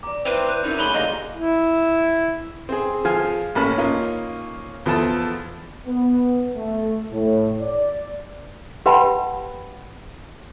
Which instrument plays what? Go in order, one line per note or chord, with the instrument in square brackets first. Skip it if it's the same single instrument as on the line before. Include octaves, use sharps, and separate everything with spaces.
[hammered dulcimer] D5 A#5 [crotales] D6
[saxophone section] C4 [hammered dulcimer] E4 [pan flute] B4 [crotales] G6 F7
[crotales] F#6 G6 D#7
[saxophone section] F#2 [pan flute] D#4 [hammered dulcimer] E4
[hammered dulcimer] F#3 G#3 A3 [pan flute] B5 [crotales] D#7 F7 G7
[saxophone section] D3 [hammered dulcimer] G3 A#3 D#4 [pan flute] D#5
[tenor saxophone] E4
[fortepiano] C4 G#4
F3 G#4 F5 G#5 F6
A1 A#3 C#4 A5 B5 F6
A#3 C#4 D#4 F4
E2 F3 A4 A5 D#6
[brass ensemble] B3
A3
A2
D5
[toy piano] G4 B4 F#5 G5 A5 B5